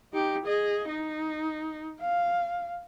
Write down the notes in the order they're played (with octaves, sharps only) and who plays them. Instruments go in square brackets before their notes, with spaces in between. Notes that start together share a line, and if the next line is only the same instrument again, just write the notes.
[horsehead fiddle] D#4 G4
G#4 D#5
D#4
F5